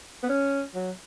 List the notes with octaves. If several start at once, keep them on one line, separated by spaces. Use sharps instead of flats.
B3
C#4
F#3